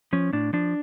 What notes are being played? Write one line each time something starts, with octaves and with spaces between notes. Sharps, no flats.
F3 C#4
A2 D4
F3 D4